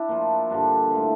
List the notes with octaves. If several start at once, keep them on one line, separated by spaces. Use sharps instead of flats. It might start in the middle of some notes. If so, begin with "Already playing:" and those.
Already playing: D4 E4
A#2 F3
G2 D3 F3 D4
A2 F3